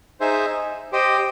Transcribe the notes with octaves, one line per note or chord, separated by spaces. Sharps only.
D#4 G#4 C5 E5
G4 C5 D#5 G5